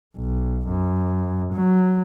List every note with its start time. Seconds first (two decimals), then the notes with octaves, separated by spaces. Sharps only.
0.16 B1
0.69 F#2
1.54 F#3